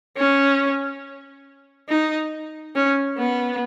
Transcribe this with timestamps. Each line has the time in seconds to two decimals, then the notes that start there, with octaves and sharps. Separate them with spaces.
0.17 C#4
1.88 D#4
2.75 C#4
3.18 B3